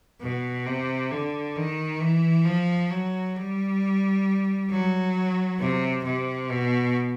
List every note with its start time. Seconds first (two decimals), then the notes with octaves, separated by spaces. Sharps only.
0.21 B2
0.67 C3
1.11 D3
1.56 D#3
2.01 E3
2.45 F3
2.90 F#3
3.36 G3
4.70 F#3
5.59 C3
6.04 C3
6.50 B2